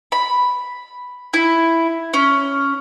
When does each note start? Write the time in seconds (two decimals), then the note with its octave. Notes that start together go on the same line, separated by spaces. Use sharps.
0.12 B5
1.34 E4
2.14 C#4